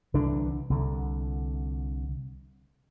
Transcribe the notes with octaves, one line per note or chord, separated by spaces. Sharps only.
C2 D3 E3 D4
C2 D3